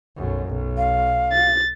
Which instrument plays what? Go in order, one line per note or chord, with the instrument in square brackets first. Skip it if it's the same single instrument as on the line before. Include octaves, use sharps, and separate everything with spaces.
[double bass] B1 F#2
B1
[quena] F5
[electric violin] A6